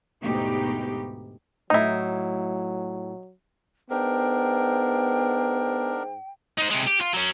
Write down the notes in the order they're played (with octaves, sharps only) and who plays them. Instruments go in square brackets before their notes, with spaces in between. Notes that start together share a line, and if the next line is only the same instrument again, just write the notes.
[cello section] D2 G#2 B2 D#4 G4
[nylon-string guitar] A2 A3 [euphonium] F#3 [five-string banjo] D#4 E4
[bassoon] G#2 [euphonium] B3 [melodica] D4 A#4 [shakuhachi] G5
[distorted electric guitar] D#4 C5
C3 G#3
G4
F4
F#3 C#4